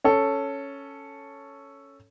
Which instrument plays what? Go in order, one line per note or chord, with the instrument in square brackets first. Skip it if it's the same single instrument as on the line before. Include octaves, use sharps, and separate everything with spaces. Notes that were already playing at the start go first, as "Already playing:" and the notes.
[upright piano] C#4 A4